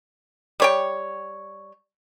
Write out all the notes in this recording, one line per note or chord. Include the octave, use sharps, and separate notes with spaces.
G3 C#5 G5